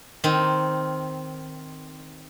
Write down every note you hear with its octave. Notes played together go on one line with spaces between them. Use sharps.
D#3 C4